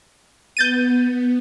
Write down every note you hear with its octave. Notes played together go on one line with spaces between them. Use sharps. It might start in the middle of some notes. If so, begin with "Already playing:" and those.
B3 G6 A6 D#7